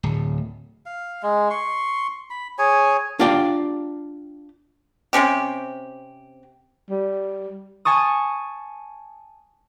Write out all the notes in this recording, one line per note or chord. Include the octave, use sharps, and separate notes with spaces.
D1
F5
G#3
C6 C#6
B5
G#4 C#5 G#5
D4 F4 G4 D5 F5 G5
C3 C4 C#4 G4
G3
G#5 A5 C#6 D#6